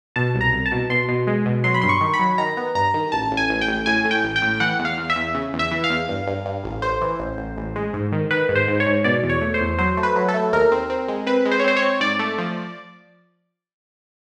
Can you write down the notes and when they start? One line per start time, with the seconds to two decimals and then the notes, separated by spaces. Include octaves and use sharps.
0.16 B2 A5
0.35 C2
0.41 A#5
0.53 C2
0.66 A5
0.72 B2
0.90 B2 C6
1.08 B2
1.27 G#3
1.46 B2
1.64 F#3 C6
1.74 B5
1.82 G2 C6
1.89 C#6
2.01 D#3
2.14 B5
2.19 F#3
2.38 D#3 A#5
2.57 B3
2.75 G2 A#5
2.94 D#3
3.12 A1 A5
3.31 A1
3.37 G#5
3.50 A1
3.61 G5
3.68 A1
3.86 A2 G#5
4.05 A2
4.11 G5
4.23 A1
4.36 G5
4.42 A2
4.60 E3 F#5
4.79 E2
4.85 F5
4.97 E2
5.10 E5
5.16 E2
5.35 C#3
5.53 E2
5.59 E5
5.71 E3
5.84 F5
5.90 E2
6.09 G2
6.27 G2
6.45 G2
6.64 A1
6.82 A1 C5
7.01 E3
7.20 A1
7.38 A1
7.57 A1
7.76 G#3
7.93 G#2
8.12 D#3
8.31 D#3 B4
8.49 G#2
8.55 C5
8.68 G#2
8.80 C#5
8.86 G#2
9.04 B2 D5
9.23 E2
9.30 C#5
9.41 A3
9.54 C5
9.61 E2
9.78 F#3 C5
9.97 A3
10.03 B4
10.16 F#3
10.29 A4
10.34 A3
10.52 D#2 A#4
10.72 C4
10.90 C4
11.08 G#3
11.26 C4 B4
11.45 G#3
11.51 C5
11.60 C#5
11.64 C4 C5
11.77 C#5
11.82 C4
12.01 G#2 D5
12.19 A3
12.38 F3